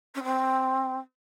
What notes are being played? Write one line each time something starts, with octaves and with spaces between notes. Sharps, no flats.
C#4
C4